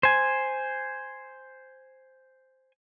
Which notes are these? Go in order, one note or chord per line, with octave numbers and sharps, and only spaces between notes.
C5 G#5